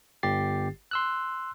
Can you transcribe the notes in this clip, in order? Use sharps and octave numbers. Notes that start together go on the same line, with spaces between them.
G1 G4 A6 C7
C6 E6 F#6